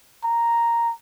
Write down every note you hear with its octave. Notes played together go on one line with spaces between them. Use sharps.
A#5